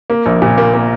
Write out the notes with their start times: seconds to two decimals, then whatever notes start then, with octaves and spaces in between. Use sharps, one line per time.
0.10 A#3
0.26 A#1
0.42 A#2
0.58 A#3
0.74 A#3